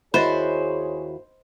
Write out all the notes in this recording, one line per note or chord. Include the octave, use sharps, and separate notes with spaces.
D#2 E4 F#4 G#4 C5 C#5 D#5 B5